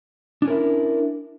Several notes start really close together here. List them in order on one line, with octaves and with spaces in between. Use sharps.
D4 C#4 A#4 E4